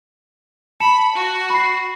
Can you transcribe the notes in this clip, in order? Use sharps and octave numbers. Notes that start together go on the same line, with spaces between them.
A5 B5 C#7 E7
F#4
B5 C7